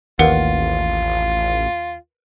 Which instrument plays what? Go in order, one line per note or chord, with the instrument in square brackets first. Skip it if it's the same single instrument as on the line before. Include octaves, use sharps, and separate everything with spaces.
[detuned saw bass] A1 [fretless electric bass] D#2 [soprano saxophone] F4 [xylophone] A#4 B4 F#5